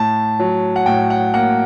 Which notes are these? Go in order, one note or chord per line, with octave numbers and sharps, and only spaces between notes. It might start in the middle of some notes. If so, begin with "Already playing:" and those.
Already playing: A2 A5
F#3
F#5
A2 G5
F#5
A#3 F#5